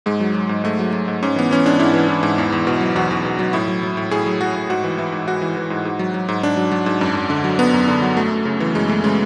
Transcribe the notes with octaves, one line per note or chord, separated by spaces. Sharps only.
G#2 G#3
F#3
F#3
G#2
G#2 A3
F#3
F#3
G#2
G#2 C#4
E3 B3
E3 C#4
G#2 D4
G#2 E4
E3
E3
G#2
E2
E2
B2
F#3
E2 F#4
E2
B2
F#3
A2 E4
F#3
F#3
A2
A2 G#4
F#3
F#3 F#4
A2
G#2 F#4
E3
E3 E4
G#2
G#2 F#4
E3
E3
G#2
G#2
F#3
F#3
G#2
G#2 D4
F#3
F#3
G#2
F#2
F#2
D3
F#3
F#2 B3
F#2
D3
F#3
F#2 A3
F#2
C#3
E3
F#2 G#3
F#2 A3
C#3 G#3